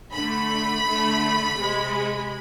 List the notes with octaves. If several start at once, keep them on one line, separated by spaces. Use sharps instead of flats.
D3 A3 B5
D3 A3
C3 G#3